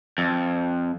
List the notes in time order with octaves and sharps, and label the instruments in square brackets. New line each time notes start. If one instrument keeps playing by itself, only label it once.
[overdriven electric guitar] F2